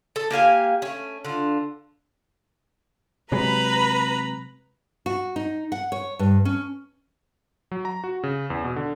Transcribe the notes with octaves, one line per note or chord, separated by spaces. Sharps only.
A4
A#3 G4 F5 G#5
A3 C#4
D3 F4
C3 F#3 G#3 B4 A#5 B5
F#4
D#4
F#5
C#5
G2
C#4
F#3
A#5
F#4
C#3
E2
B2
D3